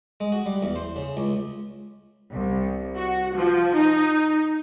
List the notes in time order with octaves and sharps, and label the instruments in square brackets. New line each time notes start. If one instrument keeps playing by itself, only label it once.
[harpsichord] G#3
F#4
G3
E2
C5
C#3
C#2
[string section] C2
F#4
F3
D#4